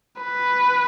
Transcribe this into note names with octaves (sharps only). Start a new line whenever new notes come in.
B4